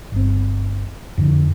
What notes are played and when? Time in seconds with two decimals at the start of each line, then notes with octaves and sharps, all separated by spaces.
0.12 G1 C4
1.18 F2 A2 D3 D4